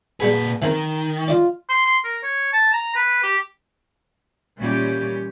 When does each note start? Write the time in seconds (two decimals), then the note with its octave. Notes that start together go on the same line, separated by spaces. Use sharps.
0.20 A#2 G3 B3 G#4 B4
0.62 D#3 E3 C4 A#4
1.28 F4 D5 D#5
1.69 C6
1.86 C6
2.04 A#4
2.23 C#5
2.53 A5
2.73 A#5
2.96 B4
3.23 G4
4.58 A#2 E3 G3 C#4 G4